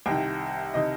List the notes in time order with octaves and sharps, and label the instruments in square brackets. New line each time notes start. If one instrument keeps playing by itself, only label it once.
[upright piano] C2 C3 D#3 G5
C3 D#3 D#5